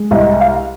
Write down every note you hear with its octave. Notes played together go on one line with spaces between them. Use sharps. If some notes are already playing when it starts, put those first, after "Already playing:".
Already playing: G#3
C2 D#5
F5